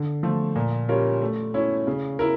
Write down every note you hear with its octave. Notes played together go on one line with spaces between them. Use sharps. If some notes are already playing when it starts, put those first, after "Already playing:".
Already playing: D3
F3 A3
A#2
G3 C#4 F4 A#4
A3
C#4 E4
C#3
E4 A#4